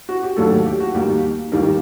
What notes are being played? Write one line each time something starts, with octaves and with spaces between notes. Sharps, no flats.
F#4
G4
D#2 D#3 F#3 A3 D4 A4
G4
G4
F#4
D#2 D#3 G3 A#3 D#4 G4
D#2 D#3 G3 A#3 D#4